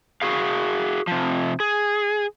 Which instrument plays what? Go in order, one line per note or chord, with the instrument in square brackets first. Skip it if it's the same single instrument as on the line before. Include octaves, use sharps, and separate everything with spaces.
[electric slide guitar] F#4 G#4 F5
C3 F3
G#4